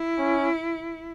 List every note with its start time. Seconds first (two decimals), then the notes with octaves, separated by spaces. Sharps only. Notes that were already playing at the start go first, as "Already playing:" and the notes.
Already playing: E4
0.19 C#4